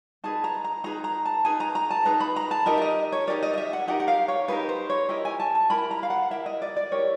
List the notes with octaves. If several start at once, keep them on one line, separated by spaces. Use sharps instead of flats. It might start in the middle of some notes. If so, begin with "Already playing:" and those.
D#4 G#4 B4 A5
A#5
A#5
D#4 G#4 B4 A#5
A#5
A5
D#4 G#4 B4 G#5
A#5
A#5
A5
D#4 G#4 B4 A#5
B5
A#5
A5
D#4 G4 A#4 D#5
E5
D#5
C#5
D#4 G4 A#4 D5
D#5
D#5
E5
F#5
D#4 G4 A#4 F#5
F#5
F5
C#5
D#4 G4 A#4 B4
C5
C#5
E4 G4 A#4 D#5
G#5
A5
A5
E4 G4 A#4 B5
A#5
F5
F#5
E4 G4 A#4 E5
D#5
D5
D5
E4 G4 A#4 C#5